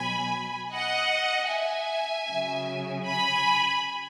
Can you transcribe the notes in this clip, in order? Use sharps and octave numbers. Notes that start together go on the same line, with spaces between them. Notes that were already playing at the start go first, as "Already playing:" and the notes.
Already playing: B2 F#3 G#5 B5
D#5 F#5
E5 G#5
C#3 F#3
G#5 B5